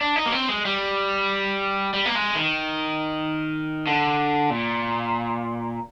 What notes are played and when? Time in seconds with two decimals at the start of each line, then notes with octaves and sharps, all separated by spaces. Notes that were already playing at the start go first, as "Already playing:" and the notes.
0.01 D4
0.16 D#4
0.26 A#3
0.32 C4
0.49 G#3
0.65 G3
1.94 G3
2.06 A#3
2.15 G#3
2.36 D#3
3.87 D3
4.50 A#2